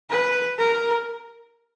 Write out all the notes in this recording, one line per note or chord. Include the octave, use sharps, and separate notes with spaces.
B4
A#4